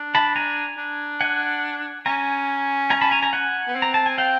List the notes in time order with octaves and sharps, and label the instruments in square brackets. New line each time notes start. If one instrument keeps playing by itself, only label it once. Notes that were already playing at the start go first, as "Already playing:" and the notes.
Already playing: [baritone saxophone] D4
[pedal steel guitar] A5 B5
G#5 A#5
[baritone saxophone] D4
[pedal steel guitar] F#5 G#5
[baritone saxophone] C#4 [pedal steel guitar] G#5 A#5
[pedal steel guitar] G#5 A#5
A5 B5
G#5 A#5
G#5 A#5
F#5 G#5
[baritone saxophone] B3
C4
[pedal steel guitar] A#5
A5
G#5
F5 G5